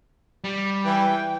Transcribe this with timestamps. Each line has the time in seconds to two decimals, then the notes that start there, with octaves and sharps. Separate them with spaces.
0.44 G3
0.86 E3 G5